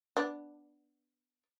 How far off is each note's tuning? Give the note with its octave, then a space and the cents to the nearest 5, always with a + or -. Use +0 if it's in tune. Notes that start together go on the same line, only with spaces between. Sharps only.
B3 +0 D4 +0